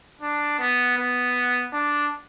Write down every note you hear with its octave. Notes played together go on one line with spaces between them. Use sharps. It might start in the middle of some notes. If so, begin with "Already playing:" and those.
D4
B3
B3
D4